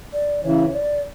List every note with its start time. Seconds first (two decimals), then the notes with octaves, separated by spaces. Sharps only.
0.13 D5
0.43 C#3 E3 C#5
0.74 D5